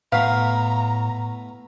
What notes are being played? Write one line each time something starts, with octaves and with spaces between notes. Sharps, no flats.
A2 A3 B3 F5 A#5